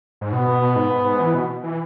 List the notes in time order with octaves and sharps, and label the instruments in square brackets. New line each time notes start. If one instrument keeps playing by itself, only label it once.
[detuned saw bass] G#2
[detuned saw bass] B2 [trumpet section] B3
[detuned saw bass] B2
B2
G#2
G#2
G#2
E3
B2
E3